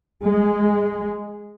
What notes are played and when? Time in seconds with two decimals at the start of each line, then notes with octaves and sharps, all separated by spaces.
0.24 G#3